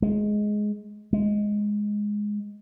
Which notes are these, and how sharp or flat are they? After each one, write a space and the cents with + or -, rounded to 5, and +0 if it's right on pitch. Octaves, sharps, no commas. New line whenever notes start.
G#3 +10
G#3 +0